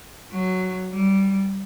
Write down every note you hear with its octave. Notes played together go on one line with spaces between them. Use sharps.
F#3
G3